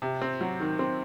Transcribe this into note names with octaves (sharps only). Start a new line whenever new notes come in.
C3
C4
F#3
D#3
C4